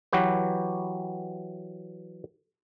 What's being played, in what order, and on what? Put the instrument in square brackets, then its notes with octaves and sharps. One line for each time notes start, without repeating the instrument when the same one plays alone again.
[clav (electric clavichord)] E3 F#3 F#4 G4 B4